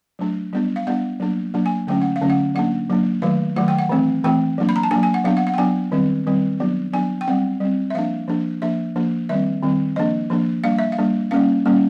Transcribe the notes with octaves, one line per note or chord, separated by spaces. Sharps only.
F#3 A3 D4
G3 B3 D4
F5
G3 B3 D4 F#5
F#3 A#3 D4
F#3 A#3 D4
G#5
D3 F#3 A3 C#4 G5
F#5
F5
D3 F#3 A3 C#4
F#5
F#3 A#3 D4 F#5
F#3 A#3 D4
D#3 F#3 A3 F5
D#3 F#3 A3 F#5
G5
F#5
E3 A3 C4
E3 A3 C4 G5
F#3 A#3 D4
B5
A#5
A5
F#3 A#3 D4 G#5
G#5
F#5
F#3 B3 D4 F5
F#5
F#5
G5
F#3 B3 D4 G#5
D#3 G3 C4
D#3 G3 C4
F#3 B3 D4
F#3 B3 D4 G#5
G5
G3 C4 F#5
G3 C4
E5
F3 A#3 D4 F5
F3 A#3 D4
F3 A#3 D4 E5
F3 A#3 D4
D#3 G3 C4 E5
D#3 G3 C4
F3 A#3 D4 D#5
F3 A#3 D4
G3 A#3 D4 F5
E5
F5
G3 A#3 D4
G3 A#3 C#4 F5
G3 A#3 C#4